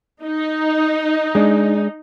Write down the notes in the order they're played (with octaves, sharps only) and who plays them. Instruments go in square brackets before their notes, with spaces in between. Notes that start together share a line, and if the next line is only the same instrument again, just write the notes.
[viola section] D#4
[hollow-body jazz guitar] G#3 D4